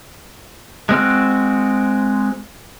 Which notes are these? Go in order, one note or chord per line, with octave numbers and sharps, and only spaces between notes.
G#3 C4 F#4 F6